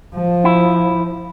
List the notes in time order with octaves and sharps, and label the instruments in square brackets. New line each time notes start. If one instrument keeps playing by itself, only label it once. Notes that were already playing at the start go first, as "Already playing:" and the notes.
[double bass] F3
[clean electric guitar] E4